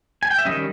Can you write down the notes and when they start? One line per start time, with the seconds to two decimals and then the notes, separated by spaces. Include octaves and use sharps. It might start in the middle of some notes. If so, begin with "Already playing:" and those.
0.23 G#5
0.31 G5
0.38 E5
0.45 D#3 G3 C#4 D#5